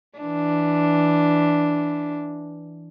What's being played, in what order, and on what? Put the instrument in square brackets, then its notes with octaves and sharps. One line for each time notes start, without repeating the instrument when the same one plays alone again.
[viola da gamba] E3 D4